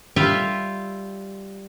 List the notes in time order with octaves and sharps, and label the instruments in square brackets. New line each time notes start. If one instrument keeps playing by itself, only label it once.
[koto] G3 F4 E5 F5